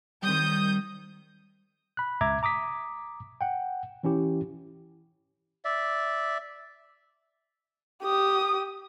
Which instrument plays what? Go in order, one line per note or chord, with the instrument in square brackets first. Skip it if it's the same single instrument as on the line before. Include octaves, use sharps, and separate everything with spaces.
[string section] D#3 D#6 G6 [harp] G3 C4
[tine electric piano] B5 F#6
C#2 E5 A#5 D6 G#6
A#5 D6 D#6 B6
F#5 G5
E3 C#4 E4 G4
[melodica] D5 E5
[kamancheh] G4 D#6